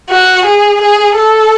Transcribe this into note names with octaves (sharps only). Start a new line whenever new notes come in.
F#4
G#4
G#4
A4